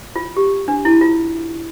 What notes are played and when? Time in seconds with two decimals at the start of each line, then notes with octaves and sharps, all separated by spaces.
0.16 F4
0.36 G4
0.68 D4
0.85 E4
1.01 F4